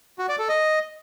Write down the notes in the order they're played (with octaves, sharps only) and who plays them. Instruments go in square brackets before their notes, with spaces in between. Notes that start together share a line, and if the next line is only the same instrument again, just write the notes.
[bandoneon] F#4
D5
A4
D#5